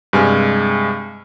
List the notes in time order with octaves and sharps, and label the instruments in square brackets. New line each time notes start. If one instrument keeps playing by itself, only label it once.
[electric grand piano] G2 C3 G#3 G#5 F6